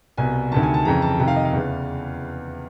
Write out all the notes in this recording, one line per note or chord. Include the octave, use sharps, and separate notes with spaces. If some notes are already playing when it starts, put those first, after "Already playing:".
C2 B2 G#5
D2 C3 D#3 A5
G#5
A5
F2 C#3 E3 A#5
A5
F2 C3 D#3 A#5
F5
D#5
F5
E2 C#3 E3